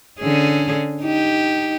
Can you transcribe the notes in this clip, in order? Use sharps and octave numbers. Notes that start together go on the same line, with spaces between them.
D3 C#4 G#4
D#4 G4